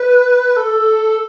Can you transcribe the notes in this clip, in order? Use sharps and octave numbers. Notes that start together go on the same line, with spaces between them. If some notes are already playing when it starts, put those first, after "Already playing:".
Already playing: B4
A4